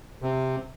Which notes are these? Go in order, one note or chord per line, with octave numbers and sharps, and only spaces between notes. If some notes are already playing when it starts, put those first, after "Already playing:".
C3